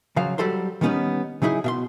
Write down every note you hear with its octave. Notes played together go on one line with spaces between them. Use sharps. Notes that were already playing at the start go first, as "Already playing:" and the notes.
C#3 F3 F#3 F5
F#3 G3 A4 C5 C6
D#3 G3 B3 C#4 D#4 B4
C#3 F#3 D#4 E4 G#4
B2 E5 C6